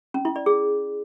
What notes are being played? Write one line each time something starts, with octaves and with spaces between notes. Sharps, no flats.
C#4
E4
D5
G#4